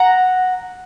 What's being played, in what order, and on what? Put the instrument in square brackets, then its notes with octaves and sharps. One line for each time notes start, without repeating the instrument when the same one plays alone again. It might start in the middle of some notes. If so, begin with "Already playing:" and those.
Already playing: [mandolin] F#5 A#5